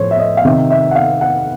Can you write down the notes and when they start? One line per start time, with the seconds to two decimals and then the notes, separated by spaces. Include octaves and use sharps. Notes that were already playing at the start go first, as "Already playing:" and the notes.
Already playing: A2 F3 C5 C#5
0.11 E5
0.19 D#5
0.37 F5
0.45 C3 D#3 E5
0.70 E5
0.91 F#5
0.95 F5
1.21 F#5